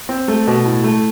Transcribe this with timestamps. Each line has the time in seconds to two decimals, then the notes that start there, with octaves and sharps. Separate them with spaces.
0.09 C4
0.28 A3
0.47 B2
0.65 A2
0.84 A3